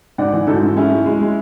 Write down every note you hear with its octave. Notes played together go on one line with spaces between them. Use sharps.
G#2 D5 F#5
E3
G#2 F#4 A4
G#2
G#3 C#4 E4
G#3
G#3
G#3